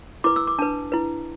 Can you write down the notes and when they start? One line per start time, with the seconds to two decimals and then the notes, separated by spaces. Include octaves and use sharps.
0.24 E4 B4 D6
0.36 E6
0.47 D6
0.58 D4 B4 A5
0.92 E4 B4